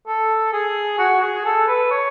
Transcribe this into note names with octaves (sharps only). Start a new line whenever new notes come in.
A4
G#4
F#4
G#4
A4
B4
C#5